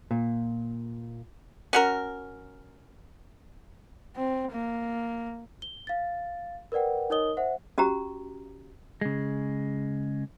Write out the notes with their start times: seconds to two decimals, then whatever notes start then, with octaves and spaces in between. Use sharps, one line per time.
0.11 A#2
1.73 C#4 F#4 A#4
4.16 C4
4.52 A#3
5.62 G7
5.87 F5 A6
6.72 A#4 B4 D5 F#5 G5
7.10 D#4 A#4 C#5 D#5 D#6 G7
7.37 C5 E5 F#5
7.78 C#4 F#4 G4 A#5
9.01 C#3 G#3